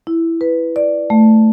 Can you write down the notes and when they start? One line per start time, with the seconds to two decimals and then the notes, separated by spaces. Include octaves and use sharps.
0.07 E4
0.41 B4
0.76 D5
1.10 A3